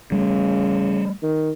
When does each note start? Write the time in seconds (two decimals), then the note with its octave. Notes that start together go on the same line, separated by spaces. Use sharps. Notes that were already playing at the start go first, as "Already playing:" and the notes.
0.12 C#3 G3 A3
1.23 D#3